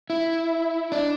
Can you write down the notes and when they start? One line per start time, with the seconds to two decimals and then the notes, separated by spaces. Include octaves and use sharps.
0.10 E4
0.92 D4